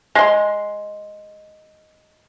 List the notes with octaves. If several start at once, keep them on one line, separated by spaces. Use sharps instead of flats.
G#3 C6